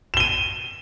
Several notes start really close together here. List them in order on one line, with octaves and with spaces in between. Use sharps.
E7 G7 D#7